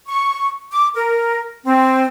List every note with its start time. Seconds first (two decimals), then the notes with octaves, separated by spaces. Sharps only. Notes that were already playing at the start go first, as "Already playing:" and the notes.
0.08 C#6
0.72 D6
0.95 A#4
1.65 C4